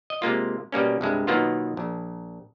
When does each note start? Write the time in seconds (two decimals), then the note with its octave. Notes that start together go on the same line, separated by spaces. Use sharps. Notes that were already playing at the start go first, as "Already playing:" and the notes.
0.10 D#5
0.22 C3 G#3 A#3 F4
0.72 B2 G3 A#3 C#4
1.01 C2 G2 G#3
1.27 B2 D#3 F#3 A#3 B3 F4
1.77 A#1